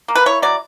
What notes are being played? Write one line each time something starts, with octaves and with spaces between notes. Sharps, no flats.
A#3
B4
E4 C#5
F#3 D5